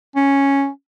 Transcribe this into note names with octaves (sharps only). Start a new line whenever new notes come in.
C#4